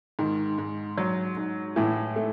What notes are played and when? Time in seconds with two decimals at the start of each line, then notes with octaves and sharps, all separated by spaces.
0.19 G#2 D#3
0.58 G#2
0.98 F#3
1.37 G#2
1.76 A2 E3
2.16 A3